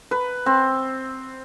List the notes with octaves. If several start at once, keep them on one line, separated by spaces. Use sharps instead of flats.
B4
C4